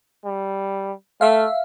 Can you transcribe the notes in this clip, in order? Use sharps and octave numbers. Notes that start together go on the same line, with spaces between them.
G3
A3 E5 F5